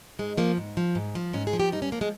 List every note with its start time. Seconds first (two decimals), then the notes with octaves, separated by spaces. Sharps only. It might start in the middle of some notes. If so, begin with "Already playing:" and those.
0.19 G#2 G#3
0.37 F3 A#3
0.57 G#2
0.77 F3
0.95 G#2
1.15 F3
1.33 G#2 C#4
1.47 G#4
1.53 F3
1.60 G4
1.72 G2 D#4
1.82 C#4
1.92 F3 A#3
2.01 G#3